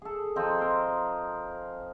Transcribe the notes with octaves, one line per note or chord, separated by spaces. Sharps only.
G#4 A4
F3 C4 D#4
A#4 C5